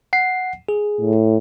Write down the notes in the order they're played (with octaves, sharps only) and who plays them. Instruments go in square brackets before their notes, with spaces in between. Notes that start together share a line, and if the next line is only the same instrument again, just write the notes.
[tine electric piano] F#5 C7
G#4
[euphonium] A2